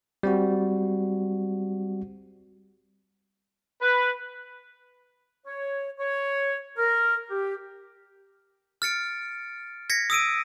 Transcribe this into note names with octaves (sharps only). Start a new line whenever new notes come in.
G3 C4 F#4
B4
C#5
C#5
A#4
G4
F6 A6 C#7 D7
G#6 A#6 B6 C#7
D#6 E6 D7 D#7